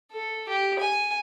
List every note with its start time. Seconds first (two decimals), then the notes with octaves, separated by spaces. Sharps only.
0.12 A4
0.49 G4
0.79 G#5